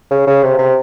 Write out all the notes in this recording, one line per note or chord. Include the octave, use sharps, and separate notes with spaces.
C#3
C#3
C3
C3